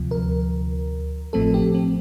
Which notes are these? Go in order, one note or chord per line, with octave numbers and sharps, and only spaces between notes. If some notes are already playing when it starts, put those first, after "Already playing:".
Already playing: D2 C3 F3
A#4
A1 A2 F3 A3 C4 A4
G4
C4